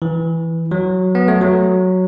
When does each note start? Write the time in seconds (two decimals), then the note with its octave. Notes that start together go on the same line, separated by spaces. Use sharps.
0.02 E3
0.71 F#3
1.15 B3
1.28 A3
1.41 F#3